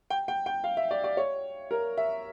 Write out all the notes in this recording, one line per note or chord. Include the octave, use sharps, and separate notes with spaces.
G5
G5
G5
F5
E5
D5
D5
C#5
A#4
E5